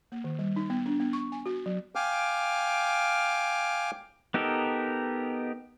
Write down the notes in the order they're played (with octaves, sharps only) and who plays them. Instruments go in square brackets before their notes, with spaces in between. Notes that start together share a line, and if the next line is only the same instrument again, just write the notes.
[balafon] A#3
D#3
G3
D#4
B3
D4
B3
C#6
G#5
F#4
F#3
[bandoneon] F5 G5 G#5 D6 F6
[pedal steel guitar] B3 D#4 G4 A4 A#4